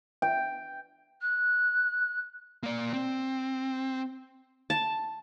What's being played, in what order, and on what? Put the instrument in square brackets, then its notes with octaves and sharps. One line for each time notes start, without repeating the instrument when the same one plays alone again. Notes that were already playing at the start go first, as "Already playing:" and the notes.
[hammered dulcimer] G5
[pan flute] F#6
[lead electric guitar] A#3 D5
C4
[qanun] A5